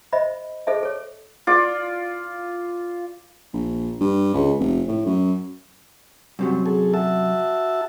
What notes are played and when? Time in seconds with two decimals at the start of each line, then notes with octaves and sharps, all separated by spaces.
0.13 C5 D#5 E5 B5
0.67 G#4 A4 C5 D#5 E5 A5
0.83 A4 C#5
1.47 F4 D5
3.53 A#1
4.01 G2
4.34 C#2
4.60 F1
4.88 A2
5.06 F#2
6.39 F#2 C3 F#3 G3
6.66 G#4 A4
6.94 F#4 E5 A5